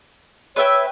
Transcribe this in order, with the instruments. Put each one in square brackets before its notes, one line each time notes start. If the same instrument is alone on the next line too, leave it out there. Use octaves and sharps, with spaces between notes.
[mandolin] B4 E5 G5 [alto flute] C#5